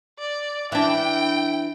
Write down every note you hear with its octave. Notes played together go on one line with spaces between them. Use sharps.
D5
E3 D4 G5